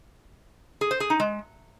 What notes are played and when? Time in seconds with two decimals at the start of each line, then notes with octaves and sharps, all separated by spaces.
0.81 G#4
0.91 C5
1.00 G#4
1.10 D#4
1.20 G#3